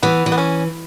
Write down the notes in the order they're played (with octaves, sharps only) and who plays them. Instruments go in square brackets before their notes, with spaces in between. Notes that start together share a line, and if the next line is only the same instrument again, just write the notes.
[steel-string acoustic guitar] E3 [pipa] B3
[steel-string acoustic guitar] E3
[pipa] B3
C#4